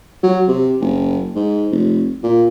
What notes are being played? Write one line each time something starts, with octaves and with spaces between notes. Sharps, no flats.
F#3
C3
F#1
G#2
F1
A#2